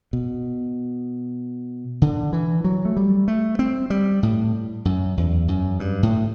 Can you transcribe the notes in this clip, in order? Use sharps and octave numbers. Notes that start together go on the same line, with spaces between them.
B2
D3
E3
F#3
A3
G3
A3
C4
G3
A2
F#2
E2
F#2
G2
A2